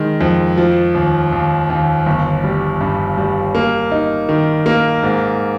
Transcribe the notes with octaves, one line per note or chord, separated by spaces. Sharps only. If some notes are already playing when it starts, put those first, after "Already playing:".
Already playing: D#3 G#3
F2
F3
D#2
D#2
D#2
G1
G3
G2
G3
A#3
D#4
D#3
A#3
G#2